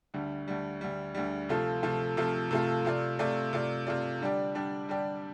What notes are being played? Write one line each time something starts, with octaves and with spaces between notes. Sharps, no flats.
D2 D3 G3
D2 D3 G3
D2 D3 G3
D2 D3 G3
C3 F3 A3 F4 A4
C3 F3 A3 F4 A4
C3 F3 A3 F4 A4
C3 F3 A3 F4 A4
C3 A3 F4 D5
C3 A3 F4 D5
C3 A3 F4 D5
C3 A3 F4 D5
D3 G3 D4 G4 D5
D3 G3 D4 G4 D5
D3 G3 D4 G4 D5